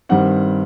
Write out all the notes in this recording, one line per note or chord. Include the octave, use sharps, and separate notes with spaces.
G2 D#3 G3 C4 F#5